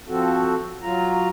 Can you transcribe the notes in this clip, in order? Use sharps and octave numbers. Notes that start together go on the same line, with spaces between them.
F3 C4 F#4 A4
F#3 F4 A#5